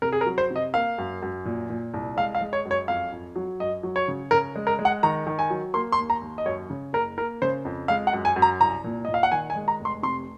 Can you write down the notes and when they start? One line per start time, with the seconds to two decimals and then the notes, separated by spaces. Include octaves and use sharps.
0.02 C3 A#4
0.12 G#4
0.21 A#4
0.26 F#3
0.38 C5
0.50 C3
0.56 D#5
0.74 A#3 F5
0.98 F#2
1.22 F#2
1.45 A#2
1.70 A#2
1.94 C2
2.17 G#3 F5
2.35 F5
2.41 G#3
2.53 C#5
2.65 F#2
2.71 C#5
2.88 F2 F5
3.12 F2
3.36 F#3
3.60 F#2 D#5
3.83 F#3
3.96 C#5
4.08 C#3
4.31 C#3 A#4
4.56 G#3
4.67 A#4
4.79 G#3
4.85 F#5
5.03 D#3 A#5
5.27 D#3
5.39 G#5
5.50 F#3
5.74 A#3 C6
5.92 C6
5.98 D#2
6.10 A#5
6.22 D#2
6.38 D#5
6.46 F#2 C#5
6.70 C#3
6.93 F#1 A#4
7.18 A#3 A#4
7.42 C#3 C5
7.65 F2
7.88 G#3 F5
8.07 F#5
8.13 F#2
8.25 G#5
8.36 F#2
8.42 A#5
8.60 C2 A#5
8.84 A#2
9.05 A#2 D#5
9.14 F5
9.23 F#5
9.32 D#3 G#5
9.50 G#5
9.55 G#3
9.68 A#5
9.80 F1 C6
10.03 C3 C6